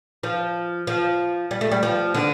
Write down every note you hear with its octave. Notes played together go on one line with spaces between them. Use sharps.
F3
F3
G3
A3
G3
F3
D3